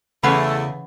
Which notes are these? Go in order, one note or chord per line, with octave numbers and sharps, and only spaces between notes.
E2 C#3 E3 A3 C#4 B4 F#5 B5